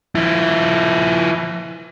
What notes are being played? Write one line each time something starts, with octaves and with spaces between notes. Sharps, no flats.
F3 E4